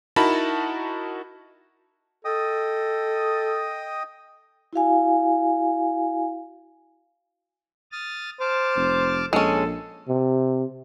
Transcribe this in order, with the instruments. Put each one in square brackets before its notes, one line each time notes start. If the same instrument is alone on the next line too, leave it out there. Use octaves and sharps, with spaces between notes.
[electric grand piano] D#4 E4 F#4 A#4 A5 B5
[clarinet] A4 [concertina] D#5 G5 D#6
[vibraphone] E4 F#4 F5 G#5
[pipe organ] D#6 F6 A6
[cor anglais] C5 [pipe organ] A5 D6 F6
[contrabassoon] F1
[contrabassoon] A#1 [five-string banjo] G#3 C#4 [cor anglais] A4
[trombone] C3